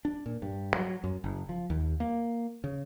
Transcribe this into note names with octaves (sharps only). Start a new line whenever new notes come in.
D4
A#2
G2
F#3
F#2
F#1
F3
D#2
A#3
C#3